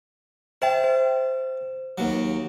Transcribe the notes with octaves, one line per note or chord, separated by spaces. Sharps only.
C5 E5 G5 A5
C5
D#2 F#3